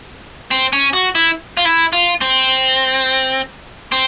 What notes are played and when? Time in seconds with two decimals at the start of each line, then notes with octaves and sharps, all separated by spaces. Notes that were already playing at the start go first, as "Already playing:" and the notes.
0.51 C4
0.73 C#4
0.93 F#4
1.15 E4
1.57 F4
1.65 E4
1.93 F4
2.21 C4
3.92 C4